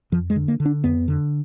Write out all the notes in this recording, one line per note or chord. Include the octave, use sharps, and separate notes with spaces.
F2 F3
G#3
D3
A#3
D3
D4
F2 B3
D3